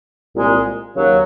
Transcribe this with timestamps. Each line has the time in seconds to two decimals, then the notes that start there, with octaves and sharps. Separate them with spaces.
0.35 C2 A#2 G#3
0.96 D#2 C#3 F#3